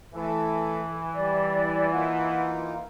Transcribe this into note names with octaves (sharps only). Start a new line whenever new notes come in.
E3 A3 A4
G3 D5
A#3 D#4 F4 F#5